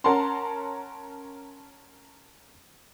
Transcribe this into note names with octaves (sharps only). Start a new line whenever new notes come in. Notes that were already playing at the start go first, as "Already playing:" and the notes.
C#4 A#4 F#5 A5 A#5 C6